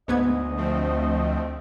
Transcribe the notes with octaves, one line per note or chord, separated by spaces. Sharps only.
D2 G#2 B3 D#5 G#6
F3 A3 C4